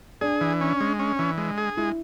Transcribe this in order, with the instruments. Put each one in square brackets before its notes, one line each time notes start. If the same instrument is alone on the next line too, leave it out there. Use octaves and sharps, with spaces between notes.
[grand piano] D4 [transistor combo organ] G#4
[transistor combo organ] E3
C#4
G#3
C#4
E3
G#3
G#4
[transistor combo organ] G#3 [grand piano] E4